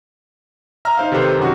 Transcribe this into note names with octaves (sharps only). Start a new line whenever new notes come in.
E5 A#5 F6
D#4 C5 F5
C3 D#3 A4 B4 C5
F#2 C3 D#3 F#4